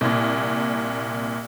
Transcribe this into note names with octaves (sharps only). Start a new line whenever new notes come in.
C2 A#2